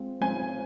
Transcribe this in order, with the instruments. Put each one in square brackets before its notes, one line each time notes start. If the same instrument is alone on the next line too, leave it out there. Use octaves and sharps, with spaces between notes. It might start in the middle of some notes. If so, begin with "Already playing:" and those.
Already playing: [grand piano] G#3 C4 F4
[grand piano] G#3 C4 F4 [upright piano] G#5